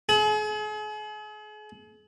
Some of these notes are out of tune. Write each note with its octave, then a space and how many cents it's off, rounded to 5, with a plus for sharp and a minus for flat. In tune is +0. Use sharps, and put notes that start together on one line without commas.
G#4 +40